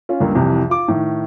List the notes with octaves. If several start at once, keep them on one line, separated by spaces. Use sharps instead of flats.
C#4 F4
C#2 G2 A#3
C2 F2 C3 E3
F4 D6
A2 D#3